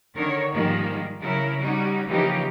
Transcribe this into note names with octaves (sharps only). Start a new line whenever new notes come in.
D3 D#3 A#4 C#5
G#2 D#3 F3 G3 G#3 A#3
C#3 F#3 E4 A#4
G3 C#4 D#4 F#4
C#3 E3 F3 A#3 D#4 G4